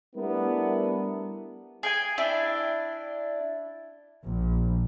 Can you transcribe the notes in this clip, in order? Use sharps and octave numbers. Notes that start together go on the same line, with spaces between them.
G3 A3 B3 D4 E4 A#4
G#4 G5 G#5
D4 E4 G5
A#1